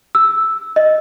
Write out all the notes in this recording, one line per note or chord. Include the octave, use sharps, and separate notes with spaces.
E6
D#5